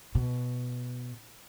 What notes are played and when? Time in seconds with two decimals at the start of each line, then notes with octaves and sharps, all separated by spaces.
0.15 B2